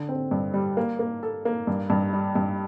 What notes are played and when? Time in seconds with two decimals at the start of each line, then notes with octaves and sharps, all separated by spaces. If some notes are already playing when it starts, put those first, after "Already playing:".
Already playing: D3
0.09 C4
0.31 G2
0.54 G3
0.77 A#3
0.99 A#3
1.23 A4
1.45 A#3
1.67 G2
1.90 G2
2.13 G3
2.35 G2